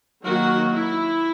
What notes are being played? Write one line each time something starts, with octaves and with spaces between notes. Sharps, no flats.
D#3 F#3 A#3 F#4
E4